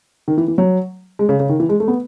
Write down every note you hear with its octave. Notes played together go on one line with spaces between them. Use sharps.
D#3
E3
E3
F#3
G#3
C#3
C#3
D#3
E3
G#3
A3
B3